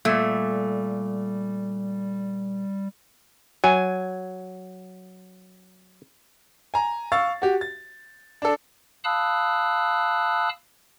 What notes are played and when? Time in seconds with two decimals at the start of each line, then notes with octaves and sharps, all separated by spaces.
0.05 A#2 G3 A3
3.64 F#3 G#5
6.74 G#5 A#5
7.12 F5 C#6 E6 A6
7.42 F#4 G4
7.61 A6
8.42 D4 A4
9.04 F5 A5 B5 D#6 E6 F#6